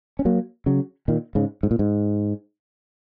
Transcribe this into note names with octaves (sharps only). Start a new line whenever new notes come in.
C#4
F#3 A#3
C#3 F#3
A#2 D#3
G#2 C#3
G#2
A#2
G#2